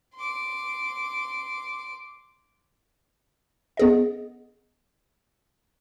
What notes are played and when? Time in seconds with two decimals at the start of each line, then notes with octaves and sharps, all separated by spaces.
0.15 C6 D6
3.77 B3 G#4 D#5